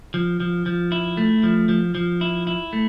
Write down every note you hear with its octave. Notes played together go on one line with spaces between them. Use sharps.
F3
F3
F3
E4
A3
F3
F3
F3
E4
E4
A3